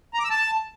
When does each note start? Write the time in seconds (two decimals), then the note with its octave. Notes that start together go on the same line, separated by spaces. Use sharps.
0.14 A#5
0.19 D6
0.25 E6
0.30 A5